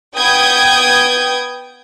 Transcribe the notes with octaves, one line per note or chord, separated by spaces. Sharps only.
B3 G5 D#6 G6 G#6